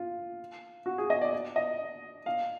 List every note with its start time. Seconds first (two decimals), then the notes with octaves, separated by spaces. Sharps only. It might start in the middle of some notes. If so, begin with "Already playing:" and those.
Already playing: F4
0.86 F#4
0.98 G#4
1.10 D#5
1.21 D5
1.33 D5
1.56 D#5
2.26 F5